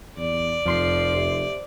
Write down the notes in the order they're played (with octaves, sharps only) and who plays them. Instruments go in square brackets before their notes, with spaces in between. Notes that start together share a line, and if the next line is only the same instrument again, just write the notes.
[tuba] E2 [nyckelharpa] D5
[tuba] F1 [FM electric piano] F2 C6 C7 [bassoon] F3
[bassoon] C3